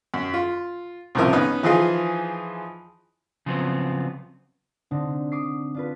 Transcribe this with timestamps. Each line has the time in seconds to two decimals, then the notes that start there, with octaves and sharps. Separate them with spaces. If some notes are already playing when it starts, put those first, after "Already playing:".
0.14 F#2
0.34 F4
1.15 C2 A2 C#3 F3 A#4 E5
1.33 B3 C#4 D#4
1.63 E3 F3 D#4 F4 G#4 D#5
3.46 C#3 F3 F#3 B3 C4
4.91 D3 C4 D4 D#4
5.32 D6 D#6 C7
5.74 D4 F4 B4